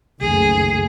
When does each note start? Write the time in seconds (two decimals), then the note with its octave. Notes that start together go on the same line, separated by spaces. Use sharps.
0.21 F#1 C2 F2 D#3 A3 G#4